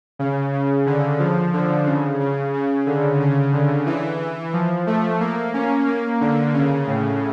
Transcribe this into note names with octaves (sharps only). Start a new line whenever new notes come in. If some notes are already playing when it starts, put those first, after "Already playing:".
C#3
C#3
D3
F3
D3
C#3
C#3
C#3
D3
C#3
D3
E3
F3
A3
A#3
C#4
A#3
D3
C#3
A2